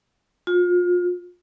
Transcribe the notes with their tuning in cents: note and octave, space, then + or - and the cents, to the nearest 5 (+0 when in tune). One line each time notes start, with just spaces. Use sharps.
F4 +30